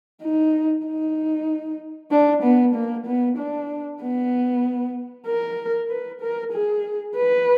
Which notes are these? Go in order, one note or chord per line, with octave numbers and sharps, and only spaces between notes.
D#4
D#4
D4
B3
A#3
B3
D4
B3
A#4
B4
A#4
G#4
B4